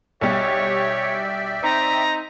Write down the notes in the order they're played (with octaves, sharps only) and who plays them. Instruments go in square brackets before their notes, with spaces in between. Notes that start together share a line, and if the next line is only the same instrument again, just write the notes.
[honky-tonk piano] B1 G3 G4 [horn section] C#5 [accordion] D5 E5 G5
[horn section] C4 D#4 [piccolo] A#5